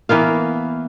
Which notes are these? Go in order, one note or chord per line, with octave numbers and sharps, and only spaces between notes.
E3 A#3 B3 F5